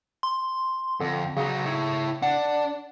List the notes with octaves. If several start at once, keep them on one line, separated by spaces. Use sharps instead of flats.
C6
F2 D3
C#3 F#3 D#4
E4 C#5
D4 F#5